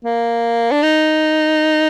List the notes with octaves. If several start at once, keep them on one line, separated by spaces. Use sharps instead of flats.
A#3
D4
D#4